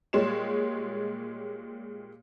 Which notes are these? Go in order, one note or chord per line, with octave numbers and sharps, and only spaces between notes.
A#2 G3 G#3 C#5 C6 E7